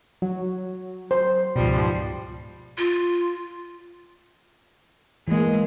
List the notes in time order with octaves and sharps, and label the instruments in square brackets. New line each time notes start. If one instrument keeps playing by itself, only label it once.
[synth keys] F#3
[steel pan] C5
[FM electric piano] C#2 B2 [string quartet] G#2 F3 G3
[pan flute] F4
[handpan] E3 A#3 [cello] G#3